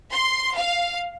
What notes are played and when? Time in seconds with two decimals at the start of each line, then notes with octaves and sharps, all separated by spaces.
0.12 C6
0.55 F5